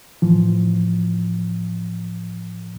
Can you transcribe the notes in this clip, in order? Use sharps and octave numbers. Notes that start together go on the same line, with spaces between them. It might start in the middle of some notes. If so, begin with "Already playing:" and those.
A2 E3 F3